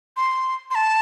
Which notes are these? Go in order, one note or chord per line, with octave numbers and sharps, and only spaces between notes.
C6
C6
A5